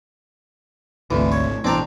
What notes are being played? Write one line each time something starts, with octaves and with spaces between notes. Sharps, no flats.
G#1 D2 C3 E3
C#5
A1 B2 E3 C4 D4 D5 A#5